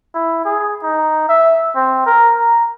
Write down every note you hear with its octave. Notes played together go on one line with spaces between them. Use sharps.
E4
G#4
D#4
E5
C4
A#4
A#5